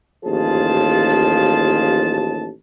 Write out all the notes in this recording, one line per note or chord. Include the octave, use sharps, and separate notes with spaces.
A1 D#2 F3 G#4 A5